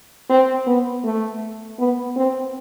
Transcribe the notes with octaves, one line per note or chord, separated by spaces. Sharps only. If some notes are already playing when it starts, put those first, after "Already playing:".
C4
B3
A3
B3
C4